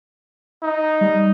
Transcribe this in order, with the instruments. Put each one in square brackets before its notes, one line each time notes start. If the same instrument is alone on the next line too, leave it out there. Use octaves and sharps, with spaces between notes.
[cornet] D#4
[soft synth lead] G3